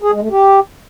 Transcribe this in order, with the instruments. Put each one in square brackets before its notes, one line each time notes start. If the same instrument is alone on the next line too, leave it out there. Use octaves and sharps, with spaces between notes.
[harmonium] G#4
G#3
A3
G4